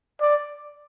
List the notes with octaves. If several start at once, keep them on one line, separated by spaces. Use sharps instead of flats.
D5